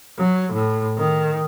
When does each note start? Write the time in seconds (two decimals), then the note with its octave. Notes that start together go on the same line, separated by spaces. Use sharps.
0.18 F#3
0.53 A2
0.98 D#3